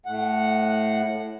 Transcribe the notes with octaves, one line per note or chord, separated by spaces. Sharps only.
A2 F#5